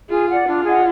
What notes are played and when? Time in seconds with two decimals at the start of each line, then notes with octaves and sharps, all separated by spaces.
0.09 F4 G#4
0.28 D5 F#5
0.47 D4 F4
0.64 G#4 D#5 F#5